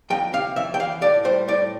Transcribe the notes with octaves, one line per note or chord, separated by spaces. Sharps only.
F2 G5
C3 F5
F2 E5
G5
E3 F5
A2 D5
G3 C5
A2 D5